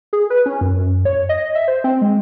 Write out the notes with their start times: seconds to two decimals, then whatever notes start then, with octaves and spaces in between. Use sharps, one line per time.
0.13 G#4
0.30 B4
0.46 C#4
0.61 F#2
1.05 C#5
1.29 D#5
1.55 E5
1.68 C5
1.84 C4
2.02 G#3